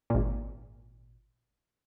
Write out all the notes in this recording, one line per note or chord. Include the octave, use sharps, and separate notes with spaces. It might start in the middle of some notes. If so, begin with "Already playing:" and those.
G#1 A#2